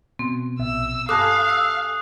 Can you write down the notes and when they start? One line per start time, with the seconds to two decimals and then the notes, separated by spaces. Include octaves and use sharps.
0.19 B2 C4
0.59 A#1 B2 E5 E6
1.09 G2 A4 F5 G#5 A5 D6 D#6 F#6
1.50 E6